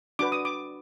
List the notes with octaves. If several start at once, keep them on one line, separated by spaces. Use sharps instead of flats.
D4 F#4 B4 D6
D#6
D6